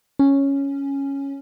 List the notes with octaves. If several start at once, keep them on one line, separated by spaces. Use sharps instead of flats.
C#4